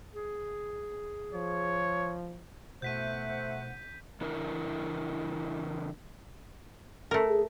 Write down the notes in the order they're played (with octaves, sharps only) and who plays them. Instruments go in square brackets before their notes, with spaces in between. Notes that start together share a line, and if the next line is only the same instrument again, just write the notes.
[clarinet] G#4
[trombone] F3 [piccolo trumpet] C#5
[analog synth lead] B2 [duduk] A3 [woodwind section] E4 C5 F#5 [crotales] G6 B6 D#7
[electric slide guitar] C#3 E3 D4 E4 A#4
[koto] A3 A#4
[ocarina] G#4